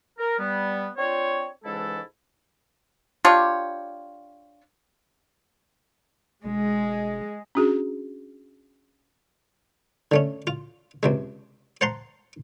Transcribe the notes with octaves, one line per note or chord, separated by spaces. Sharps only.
A#4
G3 B3
C4 D4 F4 C5 C#5
C#2 G#2 E3 G#3 E4 A4
D4 F4 G4 C#5
E1 G#3
C#4 D4 F#4 G#4
D3 A3 C#4
F4
C#2 C3 G#3
C5 F#5 A5 A#5 C6